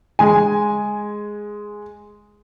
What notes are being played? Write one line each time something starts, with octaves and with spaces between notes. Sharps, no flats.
G#3 G#5